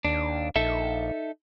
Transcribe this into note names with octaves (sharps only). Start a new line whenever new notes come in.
D#2 D4
A#1 D#4 A4 E5